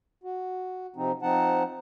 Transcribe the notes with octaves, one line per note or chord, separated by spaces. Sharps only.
F#4
C3 F3 C4 D#4
F3 C4 D#4 F#5 A5